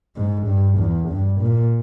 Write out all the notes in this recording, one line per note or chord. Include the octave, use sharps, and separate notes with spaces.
G#2
G2
E2
G2
A#2